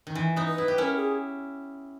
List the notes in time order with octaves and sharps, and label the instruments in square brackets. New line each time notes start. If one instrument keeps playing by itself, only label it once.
[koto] D#3
E3
B3 D#4
[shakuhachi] B4
[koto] E4
G4
[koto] C#4 E4 [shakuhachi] A#4
[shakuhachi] G#4